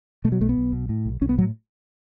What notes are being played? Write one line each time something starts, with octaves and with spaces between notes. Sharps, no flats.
B2 A3
F#3
B1 A3
B3
B1
B2
A2
B1
B1 C#4
B3
A2 F#3